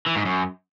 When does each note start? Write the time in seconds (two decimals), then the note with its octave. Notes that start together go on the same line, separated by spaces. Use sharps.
0.06 E3
0.16 G#2
0.25 F#2